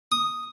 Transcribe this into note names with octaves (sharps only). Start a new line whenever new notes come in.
D#6